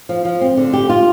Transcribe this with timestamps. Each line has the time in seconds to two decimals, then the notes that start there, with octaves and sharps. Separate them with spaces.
0.09 F3
0.25 F3
0.41 C4
0.57 D3
0.73 G4
0.89 F4